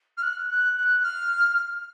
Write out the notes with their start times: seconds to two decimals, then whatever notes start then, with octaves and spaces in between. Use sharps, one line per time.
0.17 F6
0.23 F#6
0.50 F#6
0.77 F#6
1.04 F6